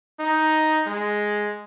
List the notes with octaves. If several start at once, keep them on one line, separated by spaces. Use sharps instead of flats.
D#4
G#3